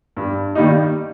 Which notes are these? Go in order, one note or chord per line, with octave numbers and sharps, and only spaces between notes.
G2
D#3 G3 A#3 D#4